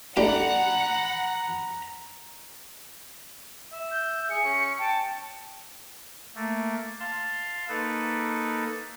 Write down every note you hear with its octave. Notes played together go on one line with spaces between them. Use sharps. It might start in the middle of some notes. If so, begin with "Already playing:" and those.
A3 D4 G4 F#5 A#5 B5
E5
G6
G#4 C#7
C#4
G5 A5
A3 A#3
F5 A5 C6
A#3 D#4 A4 B4